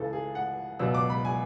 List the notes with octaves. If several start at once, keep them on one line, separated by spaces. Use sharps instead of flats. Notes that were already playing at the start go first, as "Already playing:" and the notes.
Already playing: C#2 C#3 E3 A4
G#4
F#5
C#2 B2 F#3 E6
D6
B5
G#5